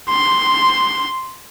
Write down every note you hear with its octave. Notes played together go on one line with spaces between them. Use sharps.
C6